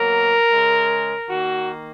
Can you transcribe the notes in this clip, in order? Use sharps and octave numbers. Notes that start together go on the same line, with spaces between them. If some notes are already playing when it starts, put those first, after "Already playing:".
Already playing: B2 F#3 A#3 A#4
C#3 G#3
D#3 A#3 F#4